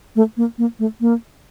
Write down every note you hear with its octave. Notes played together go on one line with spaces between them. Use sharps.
A3
A#3
A#3
A3
A#3